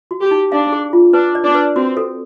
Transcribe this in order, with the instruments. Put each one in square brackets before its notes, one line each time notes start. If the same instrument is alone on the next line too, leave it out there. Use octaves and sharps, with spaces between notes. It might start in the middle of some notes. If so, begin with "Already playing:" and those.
[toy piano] F#4
[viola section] G4
[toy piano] D#4
[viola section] D4 [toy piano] F5
[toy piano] G#4
F4
[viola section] D4 [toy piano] B4
[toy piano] D5
[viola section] D4
[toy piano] B4
[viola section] C4 [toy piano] F#4
[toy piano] A4